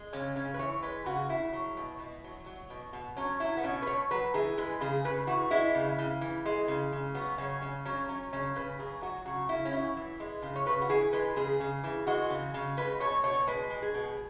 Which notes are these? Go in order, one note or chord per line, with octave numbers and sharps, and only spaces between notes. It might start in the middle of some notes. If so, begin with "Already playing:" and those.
Already playing: G#3
C#3 C#4
C#3 C#4
B4
E3 C#5
G#3 B4
C#3 F#4
C#3 E4
F#3
B2
B2
F#3
F#3
B2
B2
F#3 C#4
F#3 E4
B3
B2 C#4
B4
B2 C#5
F#3 B4
E3 G#4
G#3 B4
C#3 G#4
C#3 B4
E3 F#4
G#3 E4
C#3
C#3
E3
G#3
C#3
C#3
F#3 B3
C#3 C#4
C#3
F#3 C#4
F#3 C#4
C#3 C#4
C#3 B4
F#3 G#4
F#3 F#4
C#3 F#4
C#3 E4
C#4
F#3 E4
E3
G#3
C#3
C#5
C#3 B4
F#4
E3 G#4
G#3 B4
C#3 G#4
C#3
E3
G#3 F#4
C#3
C#3
G#3 B4
B2 C#5
B2 C#5
G#3 B4
G#3
G#4
B2